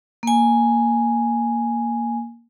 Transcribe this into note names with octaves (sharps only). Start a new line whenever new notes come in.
A#3 G#5